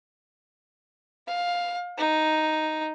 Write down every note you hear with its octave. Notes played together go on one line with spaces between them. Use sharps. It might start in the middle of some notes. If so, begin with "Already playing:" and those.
F5
D#4